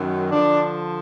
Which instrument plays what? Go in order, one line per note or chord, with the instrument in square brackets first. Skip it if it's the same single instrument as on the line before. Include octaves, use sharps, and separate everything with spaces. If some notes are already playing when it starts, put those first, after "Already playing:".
Already playing: [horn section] F#2 D#3 F#3
D3 F3 D4